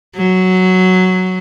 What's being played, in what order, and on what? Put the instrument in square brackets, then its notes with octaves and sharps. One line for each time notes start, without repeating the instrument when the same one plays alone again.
[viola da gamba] F#3